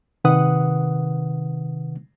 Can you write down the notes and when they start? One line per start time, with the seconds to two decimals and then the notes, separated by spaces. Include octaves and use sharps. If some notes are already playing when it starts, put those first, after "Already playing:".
0.24 C3 D#3 B4 F#5 D#6